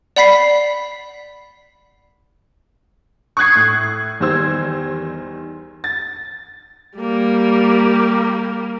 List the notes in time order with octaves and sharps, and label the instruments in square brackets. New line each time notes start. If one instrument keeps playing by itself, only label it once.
[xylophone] D5 F#5 B5 B6 C7
[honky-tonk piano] C#6 D#6 F#6 G#6 C7
A2
E2 D#3 G3 C5 E6 G#6
A6
[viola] G3 A#3